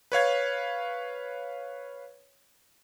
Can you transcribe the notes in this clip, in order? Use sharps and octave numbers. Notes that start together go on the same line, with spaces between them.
B4 C#5 F5 G#6